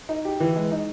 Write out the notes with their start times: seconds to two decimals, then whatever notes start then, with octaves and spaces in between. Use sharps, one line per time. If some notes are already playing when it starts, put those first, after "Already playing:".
0.09 D#4
0.25 G4
0.40 E3
0.56 G#3
0.71 D#4